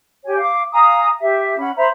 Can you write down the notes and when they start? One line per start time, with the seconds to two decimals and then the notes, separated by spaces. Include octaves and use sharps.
0.25 G4 C#5 G#5
0.39 F5 D6
0.72 F5 G#5 A#5 D#6
1.20 G4 E5
1.58 C#4 F#5 B5
1.76 C5 E5 A#5 B5